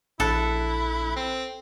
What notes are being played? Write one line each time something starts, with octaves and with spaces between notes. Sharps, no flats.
A#1 E4 A4 F#6
C4